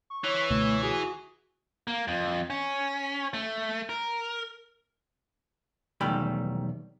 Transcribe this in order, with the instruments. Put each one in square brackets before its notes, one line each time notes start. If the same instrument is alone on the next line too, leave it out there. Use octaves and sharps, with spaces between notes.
[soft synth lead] C#6
[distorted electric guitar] E3 [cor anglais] C#5
[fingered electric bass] C#2 B2 D3 [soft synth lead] A3
[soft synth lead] F#4 [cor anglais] G#4
[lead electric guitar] A#3
F2
C#4
A3
A#4
[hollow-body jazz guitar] B1 E2 D#3 G3 A3 B5